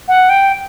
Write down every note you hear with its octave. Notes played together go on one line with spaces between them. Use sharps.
F#5
G5